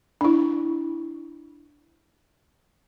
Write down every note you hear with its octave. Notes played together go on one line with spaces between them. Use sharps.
D4 E4